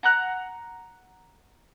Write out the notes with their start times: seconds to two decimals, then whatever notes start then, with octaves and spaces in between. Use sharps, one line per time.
0.03 F#5 A#5 F#6